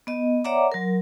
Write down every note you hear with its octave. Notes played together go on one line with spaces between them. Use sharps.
B3 D#5
C#5 D5 E5 F#5 A#5 D6
F#3 A#4